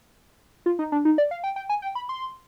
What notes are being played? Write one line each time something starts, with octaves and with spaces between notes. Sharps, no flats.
F4
D#4
D4
D#4
D5
F5
G5
G5
G#5
G5
B5
C6